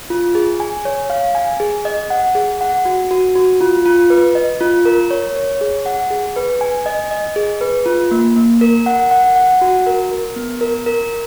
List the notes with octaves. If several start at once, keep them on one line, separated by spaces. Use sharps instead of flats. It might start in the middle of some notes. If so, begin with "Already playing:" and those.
F4
G#4
G#5
C#5
F5
G#5
G#4
D#5
F#5
G#4
F#5
F#4
F#4
F#4
F4
F4
B4
D#5
F4
A#4
C#5
C#5
G#4
F#5
G#4
B4
G#5
D#5
D#5
G#4
B4
F4
A#3
A#3
A#4
F#5
F#5
F#5
F#4
A#4
A#4
B3
A#4
A#4